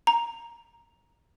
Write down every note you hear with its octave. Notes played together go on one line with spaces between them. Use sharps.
A#5